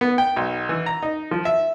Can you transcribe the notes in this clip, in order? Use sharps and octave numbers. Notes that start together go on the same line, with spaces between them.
B3
G5
B1
E3
A#5
D#4
F3
E5